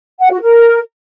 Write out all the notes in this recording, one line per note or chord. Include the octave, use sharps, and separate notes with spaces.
F#5
F#4
A#4